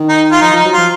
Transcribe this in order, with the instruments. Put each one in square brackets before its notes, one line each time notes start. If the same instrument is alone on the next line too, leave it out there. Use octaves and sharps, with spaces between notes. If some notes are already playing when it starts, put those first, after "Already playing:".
Already playing: [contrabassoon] D#3
[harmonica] D#4
F4
[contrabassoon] F3 [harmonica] D#4
[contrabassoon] F3 [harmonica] D#4
[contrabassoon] F#3
[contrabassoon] F3 [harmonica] F4